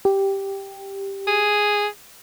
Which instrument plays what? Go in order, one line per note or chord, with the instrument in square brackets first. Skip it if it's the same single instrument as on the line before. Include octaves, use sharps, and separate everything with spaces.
[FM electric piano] G4
[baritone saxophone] G#4